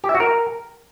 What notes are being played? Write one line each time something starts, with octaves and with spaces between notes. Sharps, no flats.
G4
E5
F#4
A#4